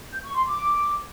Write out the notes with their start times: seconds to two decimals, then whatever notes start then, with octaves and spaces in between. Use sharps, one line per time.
0.12 G6
0.23 C#6
0.34 C6
0.45 D6